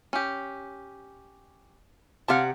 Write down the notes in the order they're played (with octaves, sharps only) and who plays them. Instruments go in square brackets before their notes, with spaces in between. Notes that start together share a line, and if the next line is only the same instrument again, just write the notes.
[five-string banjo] C#4 G4
[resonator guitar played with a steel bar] C3 G4 F#5 [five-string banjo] F5 A5